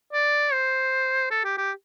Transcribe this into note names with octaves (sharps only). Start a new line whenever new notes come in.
D5
C5
A4
G4
G4